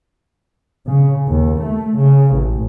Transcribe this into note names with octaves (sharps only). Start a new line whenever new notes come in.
C#3
D#2
A3
C#3
A1